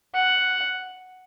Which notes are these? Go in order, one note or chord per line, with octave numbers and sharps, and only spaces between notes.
F#5